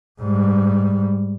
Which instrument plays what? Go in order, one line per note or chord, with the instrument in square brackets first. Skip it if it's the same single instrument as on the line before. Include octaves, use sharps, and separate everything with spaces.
[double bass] G#2 G3